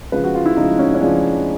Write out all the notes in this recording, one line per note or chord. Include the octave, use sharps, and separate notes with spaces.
C#3 F3 G#3 B4
F#4
F4
E4
C#3 F3 G#3 D#4
C#4
C#4
C#3 F3 G#3 D4